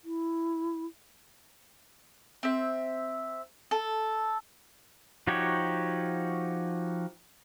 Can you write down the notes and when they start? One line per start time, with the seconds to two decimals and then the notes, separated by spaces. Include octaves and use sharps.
0.05 E4
2.43 C4 E5
3.71 A4
5.27 F3 D#4 F#4 G4 C#5